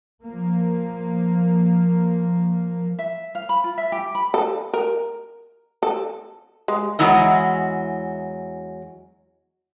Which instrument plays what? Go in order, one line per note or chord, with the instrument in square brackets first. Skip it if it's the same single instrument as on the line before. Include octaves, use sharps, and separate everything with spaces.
[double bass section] F3 A#3
[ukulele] E5
F5
B5
F4
E5
G4
B5
[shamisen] A4
A#4
A4
G#3
[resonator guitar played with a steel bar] E2 G2 F#3 G#3 E4 D#5